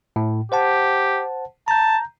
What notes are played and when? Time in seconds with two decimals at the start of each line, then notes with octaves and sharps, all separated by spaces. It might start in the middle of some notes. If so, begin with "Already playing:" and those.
0.16 A2
0.52 G4 C5 F#5 A5
1.68 A5 A#5 G6